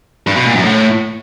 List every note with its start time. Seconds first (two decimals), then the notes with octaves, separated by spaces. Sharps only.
0.27 G2
0.36 B2
0.46 A#2
0.55 F#2
0.65 A2